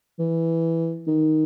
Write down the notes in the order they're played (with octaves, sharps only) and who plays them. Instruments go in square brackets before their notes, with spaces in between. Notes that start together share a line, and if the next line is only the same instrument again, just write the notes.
[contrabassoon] E3
D#3